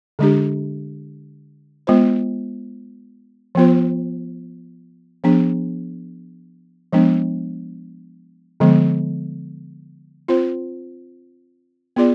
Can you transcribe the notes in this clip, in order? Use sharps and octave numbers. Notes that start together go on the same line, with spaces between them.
D3 G#3 D4 G4
G#3 B3 F4 C5
F3 B3 F4 C5
F3 B3 D4 G#4
F3 G#3 B3 D4
D3 F3 G#3 B3
C4 F4 C5
B3 F4 G#4 D5